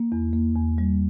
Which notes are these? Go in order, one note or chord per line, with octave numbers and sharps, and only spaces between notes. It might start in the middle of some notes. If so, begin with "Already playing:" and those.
Already playing: A#3
E2
A#3
E2
G3